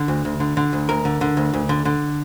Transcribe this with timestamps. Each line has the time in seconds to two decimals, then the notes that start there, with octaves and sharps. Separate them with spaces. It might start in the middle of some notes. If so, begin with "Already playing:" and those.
Already playing: D3
0.08 D2
0.25 D2
0.40 D3
0.57 D3
0.73 D2
0.89 D2 A#4
1.05 D3
1.21 D3
1.37 D2
1.53 D2
1.69 D3
1.85 D3